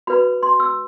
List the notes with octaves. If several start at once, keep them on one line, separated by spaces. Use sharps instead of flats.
F#4 B4 B5
C6
E6